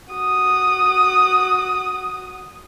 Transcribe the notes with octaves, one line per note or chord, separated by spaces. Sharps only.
F#4 D#6